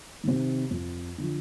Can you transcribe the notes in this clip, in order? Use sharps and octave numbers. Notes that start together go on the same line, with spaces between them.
C3 D#3
F2
D3 F3